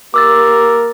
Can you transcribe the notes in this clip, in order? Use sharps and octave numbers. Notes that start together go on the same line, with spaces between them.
A#3 G4 A#4 D6 E6 A6